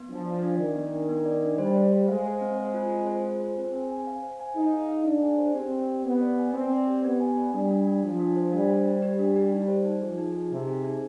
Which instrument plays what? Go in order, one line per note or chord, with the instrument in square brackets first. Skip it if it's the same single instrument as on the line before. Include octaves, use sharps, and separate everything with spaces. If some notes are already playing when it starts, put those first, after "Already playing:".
Already playing: [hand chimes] B3
[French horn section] F3 [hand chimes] D4
[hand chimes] D5
D4
[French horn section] D#3 [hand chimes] D5
[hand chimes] B3
D4
B3
D5
D4
[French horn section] G3 [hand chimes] C5
[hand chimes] C5
C5
[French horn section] G#3 [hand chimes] F5
[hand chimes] C5
C4
C5
F4
C4
C5
F4
C5
[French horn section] C4 [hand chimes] G#4
[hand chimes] G#5
G#5
F5
C5
G#5
[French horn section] D#4 [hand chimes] G#4
[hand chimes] F5
F5
[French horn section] D4 [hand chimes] G#4
[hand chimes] G#5
C5
[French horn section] C4 [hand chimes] G4
[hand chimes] D5
G4
[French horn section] B3 [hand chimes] G4
[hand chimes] D5
G#5
[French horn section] C4 [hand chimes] D5
[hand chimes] D5
G4
[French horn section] B3 [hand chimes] G4
[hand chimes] G#5
D5
[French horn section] G3 [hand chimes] D4
[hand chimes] D4
D4
[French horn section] F3 [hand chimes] D4
[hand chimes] D4
C5
[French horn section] G3 [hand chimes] D4
[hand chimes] C5
G4
G4
D4
G4
D#4
C5
D#4
[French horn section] F3 [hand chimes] G#4
[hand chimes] D#4
G#4
[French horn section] C3 [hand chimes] D#4
[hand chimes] G#4
D#4